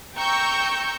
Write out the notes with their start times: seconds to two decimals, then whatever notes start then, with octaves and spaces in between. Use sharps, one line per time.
0.15 G5 A#5 C#6 E6 G6